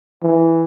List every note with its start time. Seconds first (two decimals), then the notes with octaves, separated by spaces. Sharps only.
0.23 E3